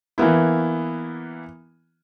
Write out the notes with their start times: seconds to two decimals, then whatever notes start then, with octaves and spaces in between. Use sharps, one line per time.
0.18 E3 A#3 B3 E4